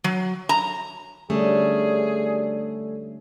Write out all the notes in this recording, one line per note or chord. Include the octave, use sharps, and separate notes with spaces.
F#3
A#5
D3 G3 A3 C#4 G4 G#4 D5